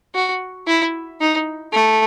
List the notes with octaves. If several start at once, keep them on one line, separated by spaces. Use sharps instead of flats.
F#4
E4
D#4
A3